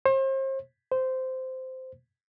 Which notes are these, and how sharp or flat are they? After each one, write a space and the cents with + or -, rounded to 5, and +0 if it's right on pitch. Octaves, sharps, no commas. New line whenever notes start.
C5 +40
C5 -10